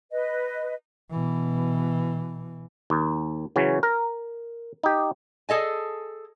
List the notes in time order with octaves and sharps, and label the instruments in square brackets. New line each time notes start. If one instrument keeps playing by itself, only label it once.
[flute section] B4 D#5
[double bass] B2 E3
[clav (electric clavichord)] D#2
C#3 E3 F#3 C#4
A#4
D#4 G4
[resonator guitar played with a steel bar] G#4 A4 D#5 G#5